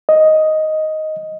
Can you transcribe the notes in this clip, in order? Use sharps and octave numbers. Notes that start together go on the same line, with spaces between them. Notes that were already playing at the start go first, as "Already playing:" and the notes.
D#5